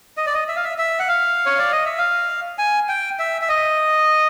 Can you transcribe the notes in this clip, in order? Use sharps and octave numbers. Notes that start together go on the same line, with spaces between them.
D#5
D5
D#5
E5
F5
E5
E5
F#5
F5
C#5
D5
D#5
E5
F5
G#5
G5
E5
E5
D#5